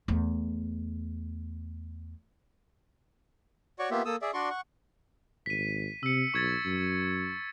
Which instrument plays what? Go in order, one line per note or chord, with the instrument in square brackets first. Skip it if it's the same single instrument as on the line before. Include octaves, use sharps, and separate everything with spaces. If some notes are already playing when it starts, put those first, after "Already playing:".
[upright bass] E2 A3
[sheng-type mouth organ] F#4 C#5 D5 C#6
A#3 B3 F4 G4 E5
A#3 A4 D#6 E6
G#4 D5 E5
D4 F#4 D5 C6 C#6
F#5 C#6
[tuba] G#1 [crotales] B6 D#7
[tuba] C3 [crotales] E6 C#7
[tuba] B1 [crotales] C#6 G#6 A6
[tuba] F#2